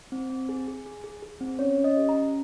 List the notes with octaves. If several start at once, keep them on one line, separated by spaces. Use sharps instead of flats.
C4
C4
G#4
G#4
G#4
G#4
G#4
C4
C#4 C#5
C#4
D#5
G4
A#5
C#4